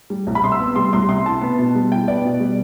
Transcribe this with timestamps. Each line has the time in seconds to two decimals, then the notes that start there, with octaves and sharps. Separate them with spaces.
0.10 G3
0.27 C2
0.35 B5
0.44 C3 C6
0.52 E6
0.60 B3
0.76 G3 C6
0.93 C2 C6
1.09 C3 C6
1.26 E4 A5
1.41 B3
1.59 B2
1.75 G3
1.92 E4 G5
2.08 B3 D5
2.25 B2
2.40 G3